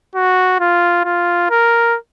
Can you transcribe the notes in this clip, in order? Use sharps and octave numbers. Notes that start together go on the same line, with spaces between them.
F#4
F4
F4
A#4